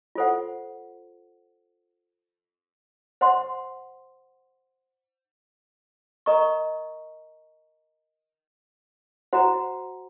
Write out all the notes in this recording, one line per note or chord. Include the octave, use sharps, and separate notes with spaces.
F4 A4 C5 F#5
C5 F#5 C6
A#4 D#5 A#5 C#6
F#4 C5 F#5 A#5